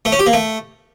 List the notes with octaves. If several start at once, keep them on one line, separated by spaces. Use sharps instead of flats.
A3
C#4
G4
A#3
A3